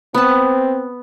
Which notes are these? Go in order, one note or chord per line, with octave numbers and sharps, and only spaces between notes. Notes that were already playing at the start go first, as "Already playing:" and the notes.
B3 C4 A5